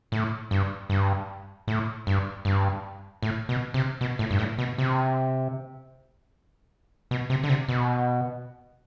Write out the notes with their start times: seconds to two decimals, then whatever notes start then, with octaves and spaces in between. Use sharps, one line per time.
0.12 A2
0.51 G2
0.90 G2
1.68 A2
2.07 G2
2.45 G2
3.23 A2
3.49 B2
3.74 C3
4.01 B2
4.19 A2
4.31 G2
4.38 A2
4.58 B2
4.78 C3
7.11 B2
7.30 C3
7.43 D3
7.49 C3
7.69 B2